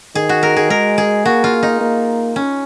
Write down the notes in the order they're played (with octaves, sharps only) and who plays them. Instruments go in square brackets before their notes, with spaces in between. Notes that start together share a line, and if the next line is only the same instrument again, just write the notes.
[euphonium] D#3 [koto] G#4
[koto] F#4
A#4
G#4
[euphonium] G#3 [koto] A#4
[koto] G#4
[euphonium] A#3 [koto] F#4
[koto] F4
D#4
[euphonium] A#3
[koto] C#4